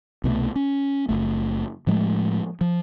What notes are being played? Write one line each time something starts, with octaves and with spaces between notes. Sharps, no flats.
C2 B2 D#3 A3
C#4
F#1 F2 A3
A2 F3 G#3 A3
F3